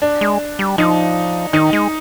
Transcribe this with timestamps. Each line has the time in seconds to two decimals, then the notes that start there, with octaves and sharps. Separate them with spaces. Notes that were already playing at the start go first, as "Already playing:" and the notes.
0.02 D4
0.21 G#3
0.59 G3
0.78 F3 D#4
1.53 D#3 D#4
1.73 G#3